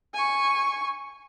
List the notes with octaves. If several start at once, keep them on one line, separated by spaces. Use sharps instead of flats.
G#5 C#6